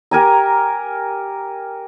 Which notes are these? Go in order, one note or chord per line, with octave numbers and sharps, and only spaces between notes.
G4 A#4 G#5 A#5